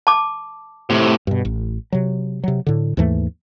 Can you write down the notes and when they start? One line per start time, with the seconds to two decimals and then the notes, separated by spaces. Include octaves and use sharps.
0.07 A5 D6
0.90 A2 C3
1.27 G2 B2
1.45 A1
1.92 C3 F#3
2.44 C3 F#3
2.66 A2 D3
2.97 D#2 G#2 E3 A3